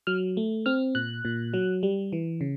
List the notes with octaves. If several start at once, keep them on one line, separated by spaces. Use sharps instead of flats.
F#3 F6
A3
C4 F6
A#2 F#6
A#2
F#3
G3
E3
C#3